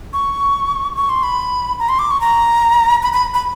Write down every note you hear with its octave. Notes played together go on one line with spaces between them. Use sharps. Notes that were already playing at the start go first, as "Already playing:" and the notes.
C#6
C#6
C6
B5
A#5
C6
D6
C#6
A#5
B5
B5
B5